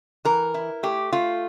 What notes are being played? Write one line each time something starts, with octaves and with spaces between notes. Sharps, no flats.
E3 A#4
E4
A3 G4
A3 F4